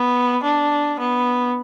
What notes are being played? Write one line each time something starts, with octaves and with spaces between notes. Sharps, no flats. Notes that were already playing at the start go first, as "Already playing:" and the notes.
Already playing: B3
D4
B3